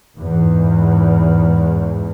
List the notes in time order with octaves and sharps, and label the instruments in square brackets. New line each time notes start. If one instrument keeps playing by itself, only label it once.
[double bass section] E2 G#2